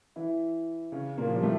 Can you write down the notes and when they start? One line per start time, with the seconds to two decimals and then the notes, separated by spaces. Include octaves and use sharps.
0.16 E3 E4
0.92 C#3 C#4
1.17 A#2 A#3
1.27 F3
1.35 G3
1.43 A2 A3